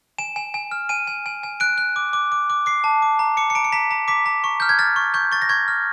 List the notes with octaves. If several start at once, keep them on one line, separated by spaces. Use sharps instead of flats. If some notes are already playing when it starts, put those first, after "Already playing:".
G#5 E7
G#5
G#5
F6
G#5 D#7
G#5
G#5
G#5
F#6 D7
F#6
D6
D6
D6
D6
D6 C7
A5
D6
A#5
D6 C#7
C#7
A#5 D7
C#7
A#5 B6
A#5
D6 B6
A#5
C#6
F6 G6
G#6
F6 A6
C#6
C#6 G6
C#6 A6
A#6
C#6 G#6
F6